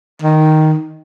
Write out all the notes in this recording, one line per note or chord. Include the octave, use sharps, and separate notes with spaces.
D#3